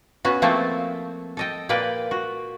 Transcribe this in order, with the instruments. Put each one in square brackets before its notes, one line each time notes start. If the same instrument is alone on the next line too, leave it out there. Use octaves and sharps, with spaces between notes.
[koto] B3 C#4 F#4
F3 A3 A#3 C4 A4 C5
A4 D#5 G5
A#2 A#3 B4 D5 G5
F#4